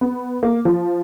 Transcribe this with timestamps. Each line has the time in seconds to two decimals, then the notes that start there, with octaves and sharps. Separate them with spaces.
0.01 B3
0.43 A#3
0.65 F3